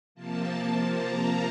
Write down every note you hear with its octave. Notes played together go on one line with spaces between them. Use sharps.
C3 F3 A#3 A5
A#5